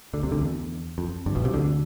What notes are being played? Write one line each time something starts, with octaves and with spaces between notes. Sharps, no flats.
D2 D3
C2 C3
D2 D3
E2
F2
G1 G2
B1 B2
C2 C3
D2 D3